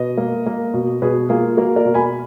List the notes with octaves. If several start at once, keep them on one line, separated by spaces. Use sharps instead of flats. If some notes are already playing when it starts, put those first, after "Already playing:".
Already playing: B2 B4 D#5
A#3
A#3
B2
B2 G#4 B4
A#3 F4 G#4
A#3 F#4 A#4
A#4 D5
B2
G#5 B5